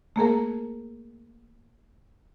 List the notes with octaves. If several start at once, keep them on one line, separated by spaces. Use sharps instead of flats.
A3 A#3 G#4 A#4